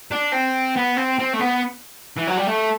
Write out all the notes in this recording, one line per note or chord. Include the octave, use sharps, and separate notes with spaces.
D4
C4
B3
C4
C4
A3
B3
E3
F#3
G3
A3